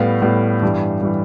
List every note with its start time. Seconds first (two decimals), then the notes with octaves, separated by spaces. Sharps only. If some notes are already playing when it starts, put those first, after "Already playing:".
Already playing: A2 G3 B3 F5
0.22 A2 G3 B3
0.62 G2 E3 G3
1.02 E3 G3